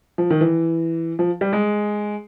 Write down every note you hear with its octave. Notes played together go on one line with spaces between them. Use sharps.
F3
D#3
E3
F3
G3
G#3